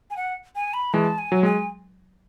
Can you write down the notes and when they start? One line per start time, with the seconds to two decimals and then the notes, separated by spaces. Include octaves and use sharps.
0.11 G#5
0.17 F#5
0.55 G#5
0.74 B5
0.93 E3 G#3 A5
1.18 G#5
1.32 F#3
1.43 G#3 G#5